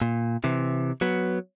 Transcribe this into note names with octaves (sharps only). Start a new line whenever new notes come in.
A#2
C3 E3
F#3 B3